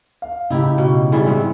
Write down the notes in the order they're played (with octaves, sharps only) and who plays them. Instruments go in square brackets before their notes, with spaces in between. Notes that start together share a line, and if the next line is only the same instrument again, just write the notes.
[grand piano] F5
[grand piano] A2 C#3 [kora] D#4 E4 G4
[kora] B2
G#2 E3 G3
G#2 B3 C4